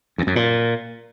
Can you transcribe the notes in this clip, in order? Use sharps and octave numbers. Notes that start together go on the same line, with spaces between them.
E2
F#2
A#2